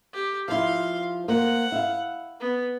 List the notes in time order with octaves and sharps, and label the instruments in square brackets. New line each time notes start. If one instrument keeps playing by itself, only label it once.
[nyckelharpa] G4
[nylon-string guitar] F3 E4 [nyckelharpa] F5 C6
[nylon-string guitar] A#3 C5 [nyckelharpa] F#5
[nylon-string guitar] E4 F5
[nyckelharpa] B3